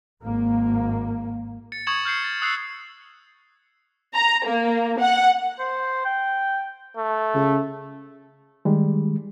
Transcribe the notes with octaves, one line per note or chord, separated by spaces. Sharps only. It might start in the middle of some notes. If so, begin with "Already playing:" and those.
G#1 A#3
A6 C#7
C#6 D#6 G#6 C#7 E7 F#7
F6 G6 C7 C#7
A6
D#6 E6 F#6 C7 C#7
A#5
A#3
F#5
C5
G5
A3
C#3
D#3 G3 G#3